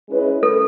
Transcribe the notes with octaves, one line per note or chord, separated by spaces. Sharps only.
G#3 C#4 E4 B4 D#5
A4